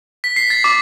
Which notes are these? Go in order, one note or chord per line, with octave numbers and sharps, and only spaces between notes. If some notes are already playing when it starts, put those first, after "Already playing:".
B6
C7
A6
D6